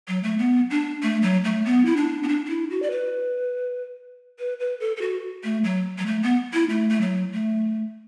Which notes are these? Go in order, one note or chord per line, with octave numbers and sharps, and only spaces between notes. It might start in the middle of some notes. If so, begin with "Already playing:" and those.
F#3
A3
B3
D4
A3
F#3
A3
B3
E4
D4
B3
D4
D4
E4
F#4
D5
B4
B4
B4
A4
A4
F#4
A3
F#3
F#3
A3
B3
E4
A3
A3
F#3
A3